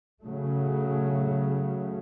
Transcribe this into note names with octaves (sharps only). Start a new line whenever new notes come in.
C#3 F#3 A3